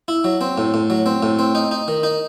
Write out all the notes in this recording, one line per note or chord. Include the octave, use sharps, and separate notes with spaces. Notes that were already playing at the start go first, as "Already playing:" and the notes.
E4
F#3
C4
A2
A2
F#3
C4
A2
C4
D#4
D#4
D#3
D#4